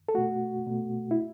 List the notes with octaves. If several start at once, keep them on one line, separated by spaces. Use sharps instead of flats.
A4
B2 A3 F#4
B2 A3
E4